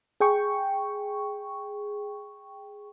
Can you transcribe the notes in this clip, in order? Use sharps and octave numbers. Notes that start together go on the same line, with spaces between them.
G#4 G5 C#6